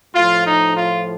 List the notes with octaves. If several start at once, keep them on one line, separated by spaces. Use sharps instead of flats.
A2 F3 F4
D#4
F4